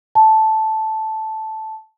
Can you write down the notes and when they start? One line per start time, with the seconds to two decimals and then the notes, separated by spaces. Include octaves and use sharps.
0.15 A5